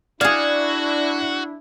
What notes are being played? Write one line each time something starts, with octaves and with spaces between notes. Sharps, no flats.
D4 E4 F#4 G#4 D5 F5 G#6